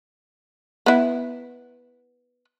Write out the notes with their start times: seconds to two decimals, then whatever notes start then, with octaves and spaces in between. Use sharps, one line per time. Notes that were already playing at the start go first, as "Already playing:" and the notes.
0.86 B3 E4